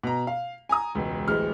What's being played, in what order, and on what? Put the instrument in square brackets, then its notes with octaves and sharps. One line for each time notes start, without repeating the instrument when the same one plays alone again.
[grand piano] B2 A#5
F5
G#5 A#5 D#6
E1 C#2
D1 A1 G#3 F6